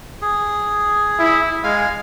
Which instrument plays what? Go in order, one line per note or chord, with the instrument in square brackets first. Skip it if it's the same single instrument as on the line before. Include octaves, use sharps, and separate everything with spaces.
[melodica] G#4
[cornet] E4
[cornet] G#3 [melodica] F5 G#5